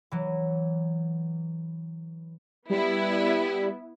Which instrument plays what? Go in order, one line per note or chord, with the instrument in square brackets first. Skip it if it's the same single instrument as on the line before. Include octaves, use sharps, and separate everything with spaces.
[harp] E3 F#3
[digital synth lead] G3 [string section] B3 E4